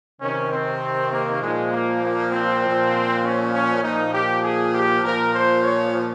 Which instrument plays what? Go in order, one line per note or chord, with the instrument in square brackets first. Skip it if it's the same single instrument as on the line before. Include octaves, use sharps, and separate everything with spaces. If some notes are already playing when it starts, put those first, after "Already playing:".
[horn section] C3 D#3 C#4
C4
A#3
A#2 F3 G#3
A#3
A#3
C4
A#2 F3
C#4
C#4
A#2 F3 D#4
G4
G#4
G4
A#2 A#4
F3
C5
C#5